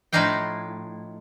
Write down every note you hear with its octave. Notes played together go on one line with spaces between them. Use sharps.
A2 F3 D4 D#4 F5 G5